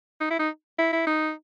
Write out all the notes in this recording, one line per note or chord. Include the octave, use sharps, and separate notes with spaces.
D#4
E4
D#4
E4
E4
D#4